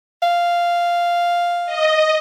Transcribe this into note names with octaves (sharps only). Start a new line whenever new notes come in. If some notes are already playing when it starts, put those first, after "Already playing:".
F5
D#5